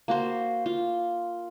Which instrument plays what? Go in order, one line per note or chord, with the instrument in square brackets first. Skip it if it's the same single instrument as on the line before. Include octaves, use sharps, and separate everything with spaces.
[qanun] A#3 F#4 C5
F4